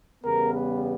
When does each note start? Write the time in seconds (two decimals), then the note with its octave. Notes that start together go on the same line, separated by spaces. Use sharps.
0.24 E2 C#3 G3 B3 A#4
0.53 B4